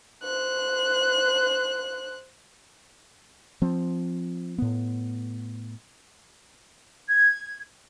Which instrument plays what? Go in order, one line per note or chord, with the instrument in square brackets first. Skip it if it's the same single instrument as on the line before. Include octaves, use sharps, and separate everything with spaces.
[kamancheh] C5 F#6
[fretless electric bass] F3 C4
A2 B3
[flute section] G#6